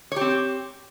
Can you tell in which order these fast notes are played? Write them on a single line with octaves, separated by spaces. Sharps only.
C#5 G4 C4